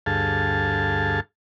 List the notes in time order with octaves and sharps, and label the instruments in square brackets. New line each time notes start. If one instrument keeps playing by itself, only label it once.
[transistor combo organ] D2 G2 G#4 A4 F5 A5